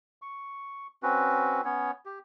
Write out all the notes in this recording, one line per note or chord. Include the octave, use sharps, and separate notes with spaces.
C#6
C4 C#4 F#4 B4
B3 C#4 C#5
G4